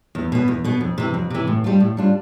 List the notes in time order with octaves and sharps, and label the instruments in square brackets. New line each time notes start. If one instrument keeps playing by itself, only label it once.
[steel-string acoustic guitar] E2
B2 B3
E2
B2 B3
F2
C3 E3
F2
C3 E3
A2
G3 D4 F4
A2
G3 D4 F4